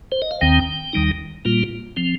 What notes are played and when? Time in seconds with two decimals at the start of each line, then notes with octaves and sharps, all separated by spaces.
0.12 C5
0.22 D#5
0.31 F5
0.41 D#2 D#3 C4 G5
0.93 D#2 D#3 G3 D#4
1.45 A#2 G3 A#3 F4
1.97 F3 C4